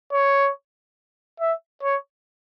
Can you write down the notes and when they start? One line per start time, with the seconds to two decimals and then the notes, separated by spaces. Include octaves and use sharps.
0.12 C#5
1.40 E5
1.83 C#5